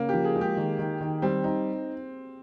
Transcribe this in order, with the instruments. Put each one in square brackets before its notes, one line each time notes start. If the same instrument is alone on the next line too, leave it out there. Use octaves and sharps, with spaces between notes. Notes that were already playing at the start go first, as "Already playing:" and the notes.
Already playing: [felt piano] C#3 [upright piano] A#3
[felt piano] F3 [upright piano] G4
[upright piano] G#4
[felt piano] G#3
[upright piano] G4
[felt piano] D#3
D#3
D#3
[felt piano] G3 [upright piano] C4
[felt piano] D#4